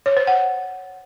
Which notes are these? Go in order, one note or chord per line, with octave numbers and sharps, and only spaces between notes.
C#5
C5
F#5